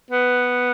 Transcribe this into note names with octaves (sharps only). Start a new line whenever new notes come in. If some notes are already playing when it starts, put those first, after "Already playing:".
B3